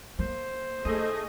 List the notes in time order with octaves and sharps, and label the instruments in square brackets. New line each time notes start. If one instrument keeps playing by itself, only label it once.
[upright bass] A#3 [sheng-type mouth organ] C5
[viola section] A3 G#4 [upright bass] D#4 [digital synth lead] D#5